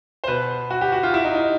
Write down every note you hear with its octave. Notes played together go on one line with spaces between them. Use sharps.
C5
B2 B4
F#4
G4
F#4
F4
E4
D#4
D#4